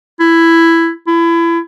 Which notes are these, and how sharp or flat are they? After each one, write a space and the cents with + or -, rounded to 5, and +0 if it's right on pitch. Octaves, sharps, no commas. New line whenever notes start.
E4 +10
E4 +30